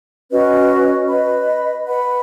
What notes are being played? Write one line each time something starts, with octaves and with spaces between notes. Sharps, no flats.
C#4 F#4 B4 D#5
B4 D#5 B5
B4 F#5 B5